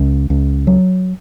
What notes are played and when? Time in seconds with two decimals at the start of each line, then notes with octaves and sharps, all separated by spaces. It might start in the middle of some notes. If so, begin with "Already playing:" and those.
Already playing: C#2
0.30 C#2
0.67 F#3